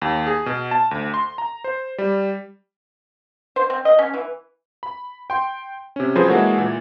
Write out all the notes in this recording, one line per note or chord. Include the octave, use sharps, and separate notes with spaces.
D#2
G#4
B2
A5
D2
C6
A#5
C5
G3
C5
C4
D#5
C#4
E3
B5
G5 C6
C3 C#4
F3 F#3 G#4 B4 C5
E3 G#3 A#3 F#4 A4 C#5
A#2 E3